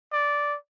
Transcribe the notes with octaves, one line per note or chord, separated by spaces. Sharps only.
D5